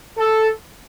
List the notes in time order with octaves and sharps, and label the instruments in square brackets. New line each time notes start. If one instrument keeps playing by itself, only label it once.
[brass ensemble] A4